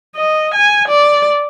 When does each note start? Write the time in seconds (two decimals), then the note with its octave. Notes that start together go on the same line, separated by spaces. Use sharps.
0.16 D#5
0.54 G#5
0.88 D5